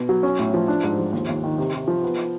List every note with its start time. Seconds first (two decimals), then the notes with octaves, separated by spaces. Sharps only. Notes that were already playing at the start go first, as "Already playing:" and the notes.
Already playing: B2
0.09 F#3
0.23 C#4
0.39 A2
0.54 F3
0.68 D4
0.84 G#2
0.99 F3
1.13 D#2
1.29 D#2
1.44 D#3
1.58 C3
1.73 C3
1.88 F3
2.03 B3